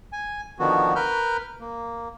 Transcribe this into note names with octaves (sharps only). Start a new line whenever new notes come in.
G#5
D3 D#3 F3 B3 F#4
A#4 B4 F6 G6
A#3